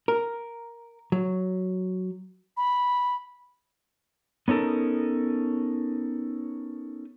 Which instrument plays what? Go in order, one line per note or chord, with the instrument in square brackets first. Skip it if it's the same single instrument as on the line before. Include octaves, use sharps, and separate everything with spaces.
[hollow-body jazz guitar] A#4
F#3
[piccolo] B5
[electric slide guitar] B3 C#4 D#4 A4 A#4